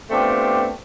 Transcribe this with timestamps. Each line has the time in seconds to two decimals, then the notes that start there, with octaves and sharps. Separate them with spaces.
0.11 A3 B3 C4 D4 F4 G4